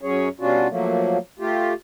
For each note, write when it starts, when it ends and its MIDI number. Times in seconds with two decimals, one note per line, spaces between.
0.01 0.29 42
0.01 0.29 54
0.01 0.29 61
0.01 0.29 68
0.01 0.29 73
0.40 0.67 47
0.40 0.67 55
0.40 0.67 61
0.40 0.67 62
0.40 0.67 65
0.40 0.67 66
0.69 1.18 53
0.69 1.18 54
0.69 1.18 57
0.69 1.18 58
1.39 1.73 57
1.39 1.73 65
1.39 1.73 67